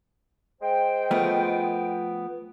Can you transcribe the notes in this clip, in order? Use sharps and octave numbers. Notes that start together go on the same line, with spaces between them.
G#3 C5 G5
F3 A3 B3